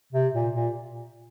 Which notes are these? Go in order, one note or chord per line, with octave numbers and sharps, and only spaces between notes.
C3
A#2
A#2